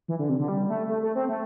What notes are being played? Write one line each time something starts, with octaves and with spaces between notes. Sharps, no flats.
E3
D3
C3
D3
G3
A3
A3
A3
C4
A3